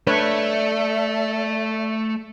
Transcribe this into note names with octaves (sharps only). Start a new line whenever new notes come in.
A3 D4 A4 B4 C#5 D5 E5